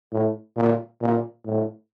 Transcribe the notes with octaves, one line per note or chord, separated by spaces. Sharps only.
A2
A#2
A#2
A2